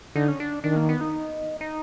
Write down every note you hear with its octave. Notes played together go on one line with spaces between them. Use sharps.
D3 D#4
C#4
D4
D#3 D4
A#3
B3
D#4
D#4